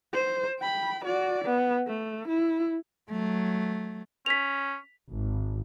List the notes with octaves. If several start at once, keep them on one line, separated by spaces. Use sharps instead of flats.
C5
G5 B5
F#4 D5
B3
A3
E4
F#3 A3
C#4 B6 F7
G#1